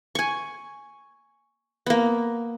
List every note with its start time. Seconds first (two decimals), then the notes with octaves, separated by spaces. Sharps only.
0.15 G#5 C#6
1.86 A#3 B3